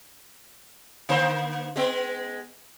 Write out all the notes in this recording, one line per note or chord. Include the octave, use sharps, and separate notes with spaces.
D3 A#3 C5
G#3 B3